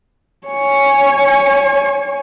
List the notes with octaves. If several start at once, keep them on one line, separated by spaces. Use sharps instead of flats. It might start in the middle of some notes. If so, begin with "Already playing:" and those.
C#5 G#5